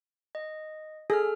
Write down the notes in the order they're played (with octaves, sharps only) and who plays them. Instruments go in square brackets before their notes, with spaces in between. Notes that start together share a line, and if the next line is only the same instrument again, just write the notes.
[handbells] D#5
[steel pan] G#4 [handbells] A4 F6